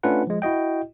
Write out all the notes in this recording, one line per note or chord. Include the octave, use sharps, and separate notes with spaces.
A3 C#4 D4 F4 B4 F#5
F3 G#3
E4 F#4 D#5 G5